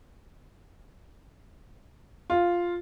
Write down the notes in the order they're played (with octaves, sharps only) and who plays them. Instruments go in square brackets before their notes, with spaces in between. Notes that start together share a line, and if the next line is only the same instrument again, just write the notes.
[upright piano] F4